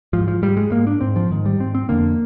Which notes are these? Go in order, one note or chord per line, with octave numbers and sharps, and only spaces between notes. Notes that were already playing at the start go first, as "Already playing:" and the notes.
G#2 F3
F3
G#2 G3
G#3
G#2 A#3
D4
G#2 C4
F3
G#2 D#3
G3
G#2 C4
C4
F2 D3 A#3